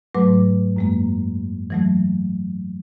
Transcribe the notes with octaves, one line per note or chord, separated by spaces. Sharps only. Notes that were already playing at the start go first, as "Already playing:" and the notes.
G#2 F#3 A3 B4 D6
F#2 G#3 A#3
E3 F#3 A3